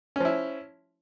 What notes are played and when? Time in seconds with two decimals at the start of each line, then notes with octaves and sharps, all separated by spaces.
0.16 C#4
0.20 F3
0.25 E4